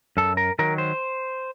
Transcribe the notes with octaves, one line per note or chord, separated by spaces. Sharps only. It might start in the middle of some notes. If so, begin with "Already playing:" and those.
F#2 A4
A#4
D#3 F#3 A#4
C5